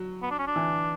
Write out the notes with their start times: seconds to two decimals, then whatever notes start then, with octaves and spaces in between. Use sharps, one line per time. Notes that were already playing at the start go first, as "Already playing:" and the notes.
Already playing: F#3
0.22 B3
0.31 D4
0.39 C#4
0.47 D4
0.56 E3